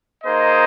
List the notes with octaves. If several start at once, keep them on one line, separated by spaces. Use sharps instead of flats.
A#3 D#4 G#4 C5 D#5